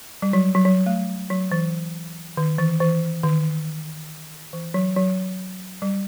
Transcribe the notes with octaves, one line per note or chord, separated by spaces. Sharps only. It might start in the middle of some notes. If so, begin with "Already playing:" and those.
G3
F#3
F#3
F#3
A3
F#3
E3
D#3
E3
E3
D#3
E3
F#3
F#3
G3